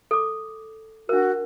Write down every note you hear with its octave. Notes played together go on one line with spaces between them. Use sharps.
A4 D6
D4 F#4 A#4